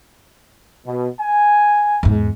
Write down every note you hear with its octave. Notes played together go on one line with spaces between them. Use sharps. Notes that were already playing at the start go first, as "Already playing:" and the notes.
B2
G#5
E2 G#2